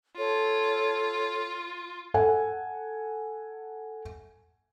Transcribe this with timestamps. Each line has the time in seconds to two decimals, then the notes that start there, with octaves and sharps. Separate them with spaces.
0.17 F4 A4 C#5
2.14 A4 F#5 G#5